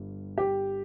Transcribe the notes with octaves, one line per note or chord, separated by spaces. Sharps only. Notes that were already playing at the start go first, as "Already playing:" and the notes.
Already playing: G1 G3
G4